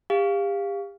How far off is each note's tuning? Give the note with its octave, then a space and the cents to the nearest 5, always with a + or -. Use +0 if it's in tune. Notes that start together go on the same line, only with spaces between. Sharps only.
G4 +35 F5 +0